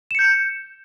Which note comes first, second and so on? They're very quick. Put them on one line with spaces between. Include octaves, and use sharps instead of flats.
E7 C#7 G6